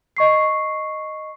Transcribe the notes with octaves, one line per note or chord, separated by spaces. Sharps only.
D#5 C#6 C7